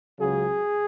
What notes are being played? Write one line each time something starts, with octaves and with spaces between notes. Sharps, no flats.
C#2 C#3 F#3 G#4